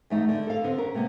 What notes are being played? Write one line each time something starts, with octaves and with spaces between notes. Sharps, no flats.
E2 A3 D#4
D3
A4 F5
D3 B3 C4
C#4 A#4
C3 A#3 B3